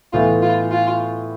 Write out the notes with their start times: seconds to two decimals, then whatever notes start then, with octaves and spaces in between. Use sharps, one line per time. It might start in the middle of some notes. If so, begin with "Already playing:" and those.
0.13 A2 E3 B3 E4 F4
0.42 F4
0.71 F4